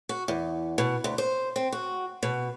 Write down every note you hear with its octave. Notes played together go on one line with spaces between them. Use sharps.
F#4
E2
B2
D2
C5
C4
F#4
B2